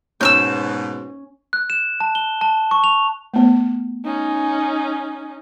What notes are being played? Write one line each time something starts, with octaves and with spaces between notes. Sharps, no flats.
G#2 B2 C#4 E6 F6 G6
F#6
E7
A5
G7
A5
C#6
F7
A3 B3
C#4 D#4